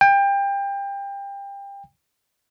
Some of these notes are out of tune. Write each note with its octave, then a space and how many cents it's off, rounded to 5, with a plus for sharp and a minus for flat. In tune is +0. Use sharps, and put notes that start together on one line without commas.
G5 +25